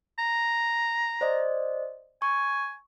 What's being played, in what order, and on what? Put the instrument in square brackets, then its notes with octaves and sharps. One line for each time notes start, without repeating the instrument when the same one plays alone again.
[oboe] A#5
[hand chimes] C5 D5 D#5
[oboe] G#5 [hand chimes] C#6